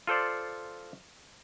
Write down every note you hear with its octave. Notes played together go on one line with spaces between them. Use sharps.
F4 A4 C5 D5